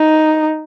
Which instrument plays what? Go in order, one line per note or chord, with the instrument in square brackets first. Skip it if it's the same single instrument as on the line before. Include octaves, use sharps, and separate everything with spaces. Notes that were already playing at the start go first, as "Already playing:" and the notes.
Already playing: [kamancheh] D#4